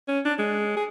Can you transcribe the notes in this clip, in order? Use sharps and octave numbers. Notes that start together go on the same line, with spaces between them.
C#4
D4
G#3
G#4